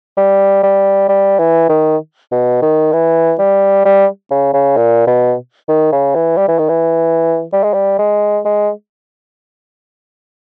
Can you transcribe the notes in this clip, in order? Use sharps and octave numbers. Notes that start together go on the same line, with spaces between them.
G3
G3
G3
E3
D#3
B2
D#3
E3
G3
G3
C#3
C#3
A#2
B2
D#3
C#3
E3
G3
E3
D#3
E3
G3
G#3
G3
G#3
G#3